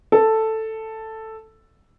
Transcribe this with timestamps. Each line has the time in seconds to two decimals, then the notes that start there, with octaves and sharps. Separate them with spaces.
0.12 A4